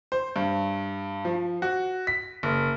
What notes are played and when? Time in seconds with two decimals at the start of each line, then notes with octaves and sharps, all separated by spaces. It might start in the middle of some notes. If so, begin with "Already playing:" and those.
0.12 C5
0.36 G2
1.25 F3
1.62 F#4
2.07 B6
2.43 F#1